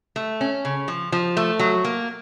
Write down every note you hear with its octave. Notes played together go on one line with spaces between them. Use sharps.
A3
C#4
C#3
F3
F3
A3
F#3
A#3